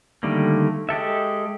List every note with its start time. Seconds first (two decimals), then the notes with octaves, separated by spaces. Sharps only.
0.23 D3 D#3 G3 A3 A#3
0.89 G#3 G4 A4 E5